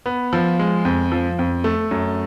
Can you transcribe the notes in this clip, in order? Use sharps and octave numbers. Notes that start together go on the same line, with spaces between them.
B3
F3
G#3
F2
F3
F2
A3
F#2